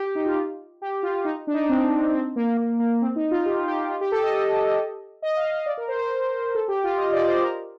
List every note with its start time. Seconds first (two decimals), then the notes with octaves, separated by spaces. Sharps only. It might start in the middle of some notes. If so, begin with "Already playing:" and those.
Already playing: G4
0.15 D#4
0.26 F4
0.82 G4
1.03 F4
1.25 D#4
1.47 D4
1.54 D#4
1.62 D4
1.69 C4
2.13 C4
2.36 A#3
2.57 A#3
2.80 A#3
3.02 C4
3.16 D#4
3.31 F4
3.46 G4
3.68 G4
3.90 F4
4.01 G4
4.12 A4
4.23 D#5
5.22 D#5
5.37 F5
5.51 D#5
5.66 D5
5.78 A#4
5.88 C5
5.99 C5
6.55 A4
6.68 G4
6.84 F4
6.98 D#5
7.13 D5
7.27 C5
7.42 A#4